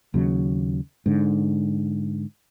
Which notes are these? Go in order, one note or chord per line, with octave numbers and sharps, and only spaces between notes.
D#2 C#3 F#3
G#2 D3